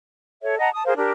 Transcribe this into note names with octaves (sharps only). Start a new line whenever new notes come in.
A4 C#5 E5
D#5 F#5 A5 A#5
A5 D#6
G#4 A#4 C5 F5
D4 G4 A#4